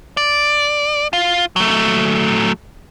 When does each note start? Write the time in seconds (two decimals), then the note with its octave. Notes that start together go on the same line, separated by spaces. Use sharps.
0.17 D5
1.13 F4
1.56 F#3 A3